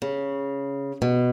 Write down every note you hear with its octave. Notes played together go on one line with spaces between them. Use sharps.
C#3
B2